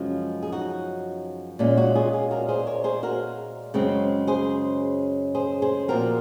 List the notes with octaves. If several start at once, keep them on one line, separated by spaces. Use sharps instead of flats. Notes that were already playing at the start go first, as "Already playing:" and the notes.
Already playing: F#2 C#3 F3 G#3 C#4 F#4
G#4
D#4 F#4
A#2 G#3 C#4
D#4 F#4
F4 G#4
F4 G#4
F#4 A#4
G#4 C5
A#4 C#5
G#4 C5
F#4 A#4
F#2 C#3 G#3 C4
G#4 C5
G#4 C5
G#4 C5
A#2 F3 C4 F#4 A#4